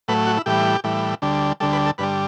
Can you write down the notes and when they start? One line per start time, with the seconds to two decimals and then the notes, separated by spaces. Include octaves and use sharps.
0.08 A2 F#3 A3 B4
0.27 F#4
0.37 E4
0.46 A2 E3 G3 G4
0.84 A2 E3 G3
1.22 D2 D3 G3
1.60 D2 D3 G3 A4
1.73 B4
1.86 A4
1.98 G2 D3 G3 B4